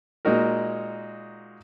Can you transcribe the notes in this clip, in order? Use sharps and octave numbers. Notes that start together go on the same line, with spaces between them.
A#2 G#3 D#4 F#4 A#4